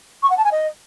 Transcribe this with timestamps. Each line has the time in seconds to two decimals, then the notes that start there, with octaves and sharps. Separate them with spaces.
0.22 C#6
0.29 F#5
0.37 A5
0.44 G#5
0.51 D#5